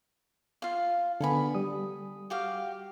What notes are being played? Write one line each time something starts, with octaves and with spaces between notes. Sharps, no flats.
F4 F5
D3 B3 A4 G#5 B5
G3 D#6
F#4 G4 F5